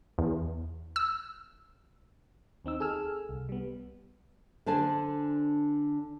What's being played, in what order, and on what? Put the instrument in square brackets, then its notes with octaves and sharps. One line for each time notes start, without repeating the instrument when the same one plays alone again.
[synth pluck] E2
E6
[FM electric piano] D#2 C4 D#4 E6
G#4 A4 G#5 E6 F6
C2
G3 B3
[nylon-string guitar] D3 D4 C5 G#5 A5